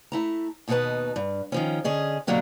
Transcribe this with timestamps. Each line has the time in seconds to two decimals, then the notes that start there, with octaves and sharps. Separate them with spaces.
0.12 A3 E4 A#5
0.68 D#2 B2 D#4 F#4 B4 A5
1.16 G2
1.52 D#3 F3 C#4
1.84 D3 C#4 G#4 D#5
2.27 B2 D3 F#3 A#3 D4 G4